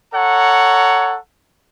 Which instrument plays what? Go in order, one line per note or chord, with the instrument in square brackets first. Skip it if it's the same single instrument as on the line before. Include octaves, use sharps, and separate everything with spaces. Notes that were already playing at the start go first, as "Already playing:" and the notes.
[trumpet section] A4 C#5 F#5 A#5